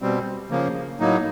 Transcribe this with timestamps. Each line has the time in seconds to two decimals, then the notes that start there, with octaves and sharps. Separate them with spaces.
0.02 B2 G3 C4
0.50 C#3 F3 A#3
1.00 A2 F#3 A#3 D#4